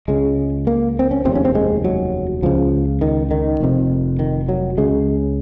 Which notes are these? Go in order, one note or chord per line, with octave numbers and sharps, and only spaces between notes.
C#2 C#3 G#3
A#3
C4
C#4
F1 D#2 C#3 C4
C#4
C4
G#3
F#3
C#2 C#3 F3
D#3
D#3
F1 F2 C3
D#3
F#3
C#2 C#3 G#3